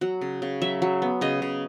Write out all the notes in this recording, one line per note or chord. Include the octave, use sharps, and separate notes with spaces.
F#3 F#4
C#3
C#3
F#3 E5
F#3
B3
C#3 D#5
C#3